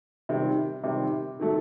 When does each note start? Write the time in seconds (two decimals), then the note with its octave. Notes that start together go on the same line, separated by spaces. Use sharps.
0.29 C3 D#3 G3
0.84 C3 D#3 G3
1.40 D#3 F#3 A3